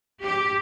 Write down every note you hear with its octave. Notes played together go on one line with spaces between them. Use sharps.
G4